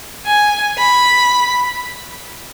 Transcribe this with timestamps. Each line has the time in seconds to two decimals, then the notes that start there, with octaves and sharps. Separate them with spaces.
0.26 G#5
0.78 B5